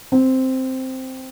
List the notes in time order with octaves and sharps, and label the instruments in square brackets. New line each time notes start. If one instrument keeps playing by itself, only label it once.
[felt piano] C4